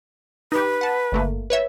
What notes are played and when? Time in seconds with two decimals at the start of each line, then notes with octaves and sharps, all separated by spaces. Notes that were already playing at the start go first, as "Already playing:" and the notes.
0.52 D#4 G4 B4
0.81 F#5 A5
1.12 G1 A3 A#3
1.50 B4 C#5 E5